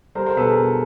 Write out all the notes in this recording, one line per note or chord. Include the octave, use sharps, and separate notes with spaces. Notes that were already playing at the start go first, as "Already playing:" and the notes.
G3 A#4 C5
A#4 C5
B2 A4 B4
G#4 A#4
B2